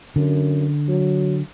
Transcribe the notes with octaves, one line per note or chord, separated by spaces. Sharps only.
F#2 D3
F#3